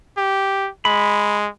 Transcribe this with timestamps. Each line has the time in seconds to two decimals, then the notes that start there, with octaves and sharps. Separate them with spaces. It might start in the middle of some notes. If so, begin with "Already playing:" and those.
0.17 G4
0.85 G#3 B5